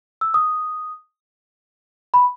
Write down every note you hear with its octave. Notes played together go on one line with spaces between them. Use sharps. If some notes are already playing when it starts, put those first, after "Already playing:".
E6
D#6
B5